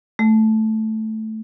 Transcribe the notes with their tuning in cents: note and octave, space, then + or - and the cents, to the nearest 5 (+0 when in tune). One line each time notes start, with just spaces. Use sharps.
A3 -5